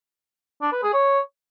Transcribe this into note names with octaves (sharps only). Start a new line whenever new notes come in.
D4
B4
G#4
C#5